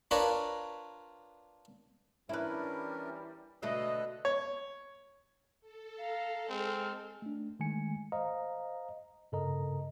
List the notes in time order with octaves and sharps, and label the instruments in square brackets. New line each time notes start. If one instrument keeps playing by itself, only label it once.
[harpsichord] D4 F4 A#4 B4 C#5 D5
[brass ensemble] E3 G3 [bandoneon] C#4 D4 A#4 [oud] E4 B4
[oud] B2 D3 A3 [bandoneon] B4 E6 F#6 [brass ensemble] D#5
[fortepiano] C#5
[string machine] A4
[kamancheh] F5 A#5
[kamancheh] G#3 F6 [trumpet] C4
[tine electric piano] A3 D4
D#3 G#3 A3 G#5 C#7
C5 D#5 F5 A#5
G2 C#3 A4 A#4 D#5 A#5